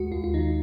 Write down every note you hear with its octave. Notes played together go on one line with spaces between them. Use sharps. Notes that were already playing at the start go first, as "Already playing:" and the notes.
Already playing: D#2 G#3 F#4
D#2 F4
F4
D#3 D#4